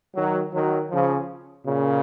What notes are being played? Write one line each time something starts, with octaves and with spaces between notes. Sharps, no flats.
D#3 F#3
D#3 F#3
C#3 F3
A#2 C#3